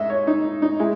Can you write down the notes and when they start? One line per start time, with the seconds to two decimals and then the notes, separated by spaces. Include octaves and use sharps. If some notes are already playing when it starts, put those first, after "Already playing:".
Already playing: G#2 D#5 E5
0.10 C#5
0.27 D#4
0.62 D#4
0.79 G#3 E4